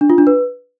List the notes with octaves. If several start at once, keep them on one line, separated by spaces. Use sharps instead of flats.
D4
F4
D4
B4